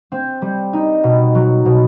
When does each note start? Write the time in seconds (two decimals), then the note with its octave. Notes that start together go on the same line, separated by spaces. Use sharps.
0.12 C4
0.42 G3
0.73 D#4
1.04 B2
1.35 F#3
1.65 B2